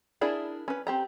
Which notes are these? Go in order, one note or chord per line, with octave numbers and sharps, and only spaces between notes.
D4 E4 G#4 A#4
C#4 B4
C4 G4 A#5